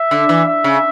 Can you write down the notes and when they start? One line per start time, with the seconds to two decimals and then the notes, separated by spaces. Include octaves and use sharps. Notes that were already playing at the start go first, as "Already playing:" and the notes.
Already playing: E5
0.11 D3
0.29 E3
0.47 E5
0.64 C#3